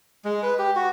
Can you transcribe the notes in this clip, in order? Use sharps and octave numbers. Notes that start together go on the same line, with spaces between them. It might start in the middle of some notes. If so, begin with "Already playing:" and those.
G#3
B4
G4
F#4